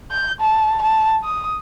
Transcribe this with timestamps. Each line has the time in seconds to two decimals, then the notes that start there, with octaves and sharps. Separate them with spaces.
0.11 G6
0.41 A5
0.82 A5
1.24 D#6